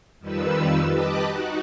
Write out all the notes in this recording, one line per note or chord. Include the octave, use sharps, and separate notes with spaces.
F2 D#3 F3 G3 B4 E6
G4 B4 D#5 A5 D6 F#6
D#4 F#4